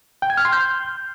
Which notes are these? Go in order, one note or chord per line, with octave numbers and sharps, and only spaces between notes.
G5
G#6
F6
C6
G6